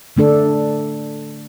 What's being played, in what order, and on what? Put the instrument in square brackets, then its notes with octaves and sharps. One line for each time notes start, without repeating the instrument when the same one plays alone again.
[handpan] D3 A3 D4 A4